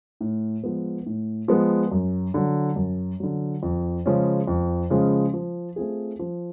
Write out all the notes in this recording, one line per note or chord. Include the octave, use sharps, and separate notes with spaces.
A2
F3 G#3 B3
A2
F3 G#3 B3
F#2
D3 F#3
F#2
D3 F#3
F2
C#3 F3 G#3 C#4
F2
C#3 F3 G#3 C#4
F3
A3 C4 F4 G#4
F3